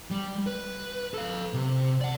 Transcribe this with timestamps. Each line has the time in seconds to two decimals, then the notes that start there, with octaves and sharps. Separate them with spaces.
0.11 G3
0.47 B4
1.14 A4 F5
1.54 C3
2.01 D5 F#5